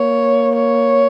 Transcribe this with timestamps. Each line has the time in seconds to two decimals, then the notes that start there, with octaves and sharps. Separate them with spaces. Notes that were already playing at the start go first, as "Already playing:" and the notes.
Already playing: A#3 C#5
0.56 C#5